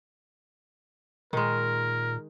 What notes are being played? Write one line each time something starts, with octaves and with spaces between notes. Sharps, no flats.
A#2 D#3 G#3 A#4